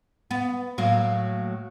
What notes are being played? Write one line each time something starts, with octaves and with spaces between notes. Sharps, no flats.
B3
A2 F#3 A#3